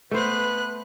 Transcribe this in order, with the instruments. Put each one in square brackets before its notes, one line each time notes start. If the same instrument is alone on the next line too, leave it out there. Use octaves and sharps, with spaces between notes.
[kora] A3 C5 [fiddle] B3 F#6 [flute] B4